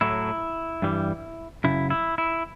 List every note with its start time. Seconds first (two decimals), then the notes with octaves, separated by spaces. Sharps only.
0.01 A2 F#3 A3 E4
0.82 G2 E3 G3
1.64 F#2 C#3 E4
1.90 E4
2.18 E4